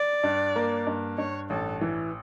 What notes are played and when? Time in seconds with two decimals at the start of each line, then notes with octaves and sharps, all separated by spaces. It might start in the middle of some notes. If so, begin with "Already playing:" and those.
Already playing: D5
0.23 G2
0.56 A#3
0.87 G2
1.17 G2 C#5
1.50 A1 A4
1.81 E3